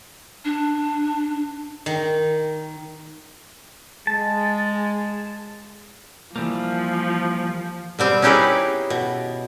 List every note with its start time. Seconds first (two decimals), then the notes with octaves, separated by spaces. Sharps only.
0.45 D4
1.86 D#3
4.07 G#3 A5
6.36 E3 F3 G3 A#3
7.99 B2 G3 C4
8.22 C#4 D#4 E4 G4 G#4 B4
8.90 B2